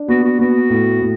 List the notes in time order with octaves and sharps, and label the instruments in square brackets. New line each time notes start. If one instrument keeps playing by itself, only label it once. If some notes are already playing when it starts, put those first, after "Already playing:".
Already playing: [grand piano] D4
[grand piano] B3 [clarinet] F#4
[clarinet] F#4
[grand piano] B3 [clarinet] F#4
[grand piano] A2
A2